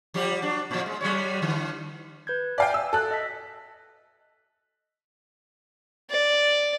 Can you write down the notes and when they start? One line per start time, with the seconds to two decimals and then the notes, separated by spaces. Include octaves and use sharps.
0.14 F3 G3 G4
0.42 F#3 D4
0.71 A2 F3
0.86 G#3
1.01 F#3 G3 C#5
1.42 D3 E3
2.27 B4 G6 G#6
2.58 D5 E5 F5 G5 G#5
2.74 E6
2.93 A4 F#6
3.11 D#5 E6 B6
6.10 D5